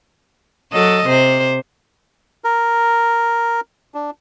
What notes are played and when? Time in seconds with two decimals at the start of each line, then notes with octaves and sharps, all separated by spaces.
0.72 F#3 A4 D#5
1.06 C3 C5
2.44 A#4
3.95 D4